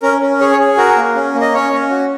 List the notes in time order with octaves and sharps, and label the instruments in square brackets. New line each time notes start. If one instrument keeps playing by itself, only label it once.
[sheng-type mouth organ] C#4 A#4
C#4
G#4 C#5
C#5
G#4
F#4 A#4
A#3
C#4
A#3
D#5
C#4 C#5
C#4
F#4